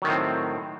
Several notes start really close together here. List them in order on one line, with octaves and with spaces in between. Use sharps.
F#3 D#3 A2 C4